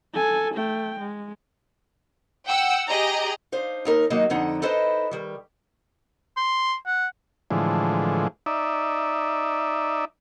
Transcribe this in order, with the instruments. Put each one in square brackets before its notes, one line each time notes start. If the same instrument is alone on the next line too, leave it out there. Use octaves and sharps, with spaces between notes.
[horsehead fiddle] A4 G#5
A3 G5
G#3
[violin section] F#5 G5 E6
G4 G#4 D#5 A#5
[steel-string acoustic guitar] D4 D#4 C5 F5
D#2 D#4 A#4
D#3 F#3 A#3 D#4 F#4 D#5
F2 D3 D#4 F#5
D#4 E4 A4 B4 C5 D#5
D#3 G3
[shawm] C6
F#5
[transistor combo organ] A2 D3 E3 F3 G#3
D#4 D5 E5